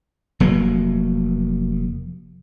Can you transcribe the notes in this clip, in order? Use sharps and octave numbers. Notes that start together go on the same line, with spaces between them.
F1 F#3 A#3